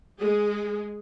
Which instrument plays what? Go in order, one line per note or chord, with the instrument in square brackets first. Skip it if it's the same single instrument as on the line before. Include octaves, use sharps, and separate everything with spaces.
[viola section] G#3 G#4